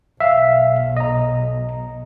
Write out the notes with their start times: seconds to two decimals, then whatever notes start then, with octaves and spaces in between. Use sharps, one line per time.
0.20 B1 E5 F5
0.97 D#5 A#5